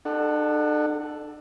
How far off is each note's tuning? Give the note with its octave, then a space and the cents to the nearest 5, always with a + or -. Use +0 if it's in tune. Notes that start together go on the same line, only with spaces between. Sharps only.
D4 +45 A4 +0 F#5 +0